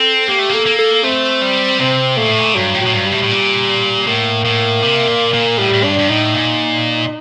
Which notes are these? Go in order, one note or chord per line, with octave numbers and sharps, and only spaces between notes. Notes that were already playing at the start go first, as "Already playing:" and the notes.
Already playing: C4 A4
A#3 G4
A3
A#3 A4
A#3
A4
A3 C4
G3
C3 C4
A#2 A3
A2
A#2
G2 F#3
A2
F#3
A2
G2
G3
A2
A2
A#2
A2 A#3
A2
C3
A#2
A#2
A2 G3
A2
G2 D4
G2
A2 D#4
A#2